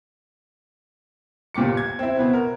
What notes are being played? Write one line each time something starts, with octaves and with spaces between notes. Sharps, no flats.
G1 A#2 G4 D6 C#7
G#6
C4 E4
B2 B3 C4
A#4